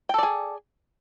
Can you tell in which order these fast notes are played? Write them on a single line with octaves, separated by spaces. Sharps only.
G5 A4 D5 G#4